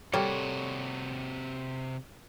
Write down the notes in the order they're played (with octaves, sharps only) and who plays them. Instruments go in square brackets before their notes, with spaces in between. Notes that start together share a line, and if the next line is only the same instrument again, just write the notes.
[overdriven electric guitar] C3 F#4 [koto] G3 A#3 [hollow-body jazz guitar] A4 C#5